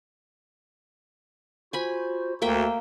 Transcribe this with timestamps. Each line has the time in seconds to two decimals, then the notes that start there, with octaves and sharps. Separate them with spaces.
1.73 F4 F#4 C5 G#5 B5
2.42 D2 A#3 F#4 A4 E5 G5